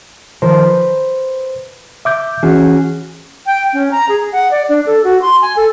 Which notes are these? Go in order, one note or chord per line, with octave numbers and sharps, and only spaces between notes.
D#3 F3 A#4 C5
B4
E5 D6 G6
E3 C#4 F#4 G#4
G5
C#4
A#5
G#4
F#5
D5
D4
A4
F#4
C6
G#5
A4